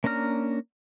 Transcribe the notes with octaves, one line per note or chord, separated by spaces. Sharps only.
A#3 C#4 D4 A#5 F6